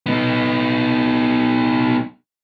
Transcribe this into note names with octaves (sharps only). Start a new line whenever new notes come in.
B3 D#4